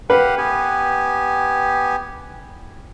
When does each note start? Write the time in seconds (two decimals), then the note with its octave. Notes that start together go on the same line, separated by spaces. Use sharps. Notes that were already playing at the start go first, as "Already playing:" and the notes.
0.10 G4 B4 F5 F#5
0.38 B3 G4 G#5